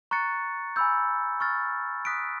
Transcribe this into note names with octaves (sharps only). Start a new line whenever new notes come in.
A#5 C#6 F#6 A6 C#7
G#5 B5 E6 G6
C#6 F6 A6
D#6 F#6 B6 D7